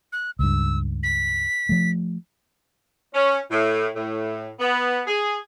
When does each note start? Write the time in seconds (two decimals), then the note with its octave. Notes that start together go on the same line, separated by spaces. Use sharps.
0.13 F#6
0.39 C#2 G2 E6
1.03 B6
1.69 F3 A3
3.13 C#4
3.50 A2
3.95 A2
4.59 B3
5.06 G#4